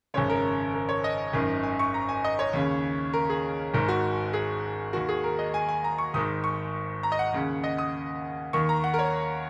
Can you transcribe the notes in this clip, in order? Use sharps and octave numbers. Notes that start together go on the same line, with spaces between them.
G#1 F#2 C#3 C#5
A#4
A#4
C#5
D#5
G#1 F#2 D#3
G#5
C#6
A#5
G#5
D#5
C#5
D#2 C#3
A#4
G#4
G#1 G#2 D#3 A#4
F#4
G#4
D#2 D#3 F#4
G#4
A#4
D#5
G#5
G#5
A#5
C#6
G#1 G#2 D#3 D#6
C#6
A#5
D#5
F#5
D#2 C#3
D#5
D#6
D#2 D#3 C#6
A#5
F#5
A#4
C#5